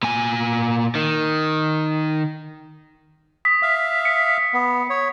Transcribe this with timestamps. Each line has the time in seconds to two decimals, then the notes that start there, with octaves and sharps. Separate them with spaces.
0.03 A#2 G#5
0.95 D#3
3.45 D#6 B6
3.62 E5 F5
4.05 C#7
4.53 B3
4.90 C#5